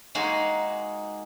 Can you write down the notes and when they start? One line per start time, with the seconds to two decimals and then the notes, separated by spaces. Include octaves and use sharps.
0.15 G#3 A#3 D#4 F#4 G#4